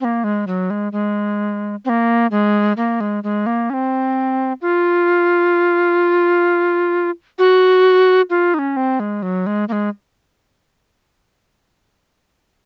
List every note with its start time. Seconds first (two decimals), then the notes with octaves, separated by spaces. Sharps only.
0.01 C4
0.05 A#3
0.24 G#3
0.47 F#3
0.70 G#3
0.92 G#3
1.85 C4
1.89 A#3
2.31 G#3
2.77 A#3
3.00 G#3
3.24 G#3
3.46 A#3
3.70 C#4
3.74 C4
4.61 F4
7.38 F#4
8.30 F4
8.54 D#4
8.59 C#4
8.77 C4
9.00 G#3
9.22 F#3
9.46 G#3
9.69 A#3
9.72 G#3